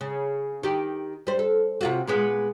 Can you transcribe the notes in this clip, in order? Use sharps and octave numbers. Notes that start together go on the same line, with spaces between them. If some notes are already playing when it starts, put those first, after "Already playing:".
C#3
D#3 G4
G3 C5
A4
C3 F4 F#4
A#2 G#3 B3